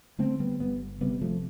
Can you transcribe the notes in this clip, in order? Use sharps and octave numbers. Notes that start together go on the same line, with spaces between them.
D3 A3 C4
G3 B3
G1 G3 B3
C3 G3 B3
F3 A3